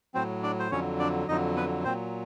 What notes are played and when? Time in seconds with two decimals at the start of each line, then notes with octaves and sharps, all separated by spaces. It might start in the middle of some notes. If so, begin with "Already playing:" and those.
0.14 A2 F#3 C4 C5
0.43 D4 D5
0.60 C5
0.71 F2 D3 F#3 C#4 C#5
1.00 D4 D5
1.28 F2 D3 F#3 D#4 D#5
1.56 B3 B4
1.85 A#2 F#3 C4 C5